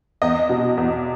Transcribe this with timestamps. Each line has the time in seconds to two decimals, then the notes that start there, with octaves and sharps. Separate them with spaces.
0.22 E2 D#5
0.49 B2
0.78 E2